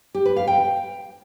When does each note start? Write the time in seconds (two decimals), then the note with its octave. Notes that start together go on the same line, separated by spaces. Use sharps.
0.15 G4
0.26 B4
0.36 F5
0.47 G5